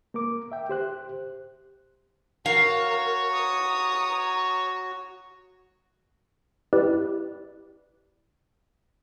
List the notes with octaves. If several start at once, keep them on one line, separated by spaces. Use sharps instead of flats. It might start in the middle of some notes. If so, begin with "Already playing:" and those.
A#3 A#4 D6
E5 G5
G4 C5 F#6
F#4 A#4 C#5 F5
A#5 D#6
E4 G4 B4 D5